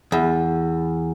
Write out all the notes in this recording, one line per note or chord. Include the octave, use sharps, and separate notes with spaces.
E2